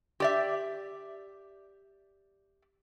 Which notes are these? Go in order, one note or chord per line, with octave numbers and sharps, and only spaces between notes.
G4 D5 E5